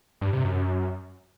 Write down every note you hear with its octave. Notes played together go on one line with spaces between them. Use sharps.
G2
C3
F#2